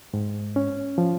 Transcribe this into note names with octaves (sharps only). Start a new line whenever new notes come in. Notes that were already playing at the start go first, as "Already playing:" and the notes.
G#2
C#4
F3